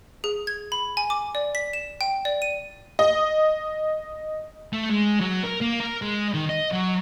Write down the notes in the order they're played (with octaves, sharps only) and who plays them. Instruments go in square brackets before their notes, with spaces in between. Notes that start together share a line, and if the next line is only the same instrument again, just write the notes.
[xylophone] G#4
G#6
B5
G#5
D6
D5
B6
E7
G5
D5
D#7
[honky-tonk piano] D#5
[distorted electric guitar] A3
G#3
F#3
A#4
A#3
A#4
G#3
D#3
D#5
F#3